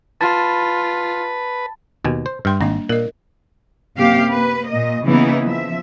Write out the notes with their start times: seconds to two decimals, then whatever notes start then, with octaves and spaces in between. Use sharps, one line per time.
0.21 F4 B4 A5 B5 A6
2.05 D#2 B2 G#5
2.26 C5
2.45 G2 G3 G5 C6
2.61 G#1 A#3 D4 D#5
2.89 A#2 A#4 D#5
3.97 F#2 C3 A#3 G4 F5
4.32 A#3 B4
4.70 A#2 D#5
5.06 C#3 E3 A#3 B3 D#4 E4
5.44 F3 E5